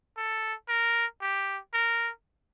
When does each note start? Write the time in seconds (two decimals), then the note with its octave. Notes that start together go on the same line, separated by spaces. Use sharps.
0.17 A4
0.69 A#4
1.22 G4
1.74 A#4